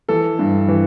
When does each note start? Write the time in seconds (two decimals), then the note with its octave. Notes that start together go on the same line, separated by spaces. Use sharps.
0.09 E3 A4
0.39 G2
0.68 E3